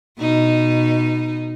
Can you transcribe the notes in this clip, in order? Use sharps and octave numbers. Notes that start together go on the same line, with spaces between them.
B2 D#4